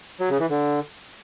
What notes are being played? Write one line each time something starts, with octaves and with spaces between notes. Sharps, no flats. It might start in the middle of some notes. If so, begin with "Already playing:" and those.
F#3
C#3
E3
D3